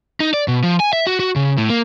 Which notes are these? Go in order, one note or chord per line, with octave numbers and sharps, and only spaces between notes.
D#4
D5
B2
F3
G#5
E5
F#4
F#4
C#3
A2
A#3